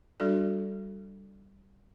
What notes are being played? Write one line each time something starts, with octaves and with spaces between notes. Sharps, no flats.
G3 D4 F#4 A4 D5